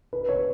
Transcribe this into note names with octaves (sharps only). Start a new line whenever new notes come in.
B4
C#5